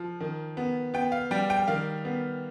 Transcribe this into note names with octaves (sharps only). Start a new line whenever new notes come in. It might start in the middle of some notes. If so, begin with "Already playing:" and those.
Already playing: F3
D#3
B3
B3 G5
F5
G3 G5
G5
D#3 F5
B3